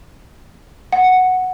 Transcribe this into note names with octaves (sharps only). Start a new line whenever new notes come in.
F#5